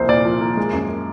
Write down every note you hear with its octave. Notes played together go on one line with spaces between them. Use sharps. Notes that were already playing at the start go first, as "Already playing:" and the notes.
Already playing: C2 F3 A#3 C5
A#2 D5
F3
A#3
G#3
F#2